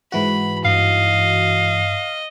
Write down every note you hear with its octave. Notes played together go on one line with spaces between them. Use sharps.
G#2 E3 F#4 B5
G2 D#5 F5